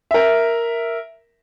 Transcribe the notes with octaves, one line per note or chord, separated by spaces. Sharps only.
A#4 E5